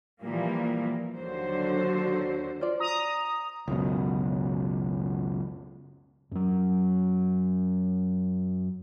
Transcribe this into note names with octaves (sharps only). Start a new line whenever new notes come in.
A#2 E3 F3 G3 A#3
D#2 D3 F#3 F#4 C5
F4 C5 D5
A#5 D#6
C#2 F#2 B2
F#2 F#3